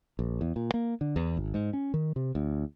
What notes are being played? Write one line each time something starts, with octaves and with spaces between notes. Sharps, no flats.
A#1
E2
A#2
A#3
D3
E2
G#1
G#2
C#4
D#3
C3
D2